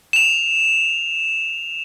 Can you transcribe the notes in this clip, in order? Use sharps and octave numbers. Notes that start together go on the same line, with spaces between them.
E7 F7